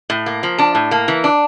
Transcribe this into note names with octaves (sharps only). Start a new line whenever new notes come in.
A2
A#3
F3
D4 A5
A2
A#3
E3
D4